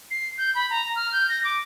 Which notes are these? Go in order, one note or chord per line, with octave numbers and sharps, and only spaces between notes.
C7
G6
B5
A#5
F6
G6
A#6
D6